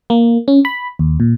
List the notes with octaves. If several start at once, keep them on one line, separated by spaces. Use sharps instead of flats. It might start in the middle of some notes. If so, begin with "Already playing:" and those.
A#3
C#4
B5
D#2
A#2